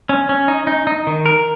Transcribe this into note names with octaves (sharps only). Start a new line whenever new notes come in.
C#4
C#4
D#4
D#4
D#4
D#3
A#4